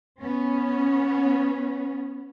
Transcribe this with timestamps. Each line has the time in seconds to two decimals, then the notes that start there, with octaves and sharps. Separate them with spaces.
0.22 B3 C#4